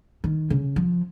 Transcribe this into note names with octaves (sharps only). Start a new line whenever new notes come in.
D#3
C#3
F3